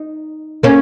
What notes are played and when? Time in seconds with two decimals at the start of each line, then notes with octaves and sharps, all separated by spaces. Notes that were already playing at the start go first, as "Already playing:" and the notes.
Already playing: D#4
0.63 A#3 C#4